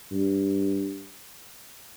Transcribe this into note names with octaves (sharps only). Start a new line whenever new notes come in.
G2